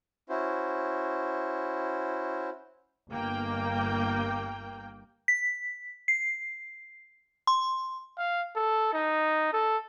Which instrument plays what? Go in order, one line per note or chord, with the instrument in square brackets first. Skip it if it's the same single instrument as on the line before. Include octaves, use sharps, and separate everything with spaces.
[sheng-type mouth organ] C#4 E4 F#4 C5
[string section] G1 A#3 G5
[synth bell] B6
C7
C6
[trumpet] F5
A4
D#4
A4